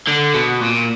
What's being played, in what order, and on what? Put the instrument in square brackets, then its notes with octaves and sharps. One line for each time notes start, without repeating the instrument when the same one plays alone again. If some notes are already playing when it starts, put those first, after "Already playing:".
[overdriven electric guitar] D3
B2
A#2